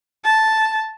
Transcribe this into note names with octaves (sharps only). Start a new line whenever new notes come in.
A5